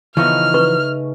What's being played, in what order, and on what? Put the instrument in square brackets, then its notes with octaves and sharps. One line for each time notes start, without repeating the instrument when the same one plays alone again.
[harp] C#3 A3 D#4 [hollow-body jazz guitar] E3 F3 B3 [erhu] F6
[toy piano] B4 C#6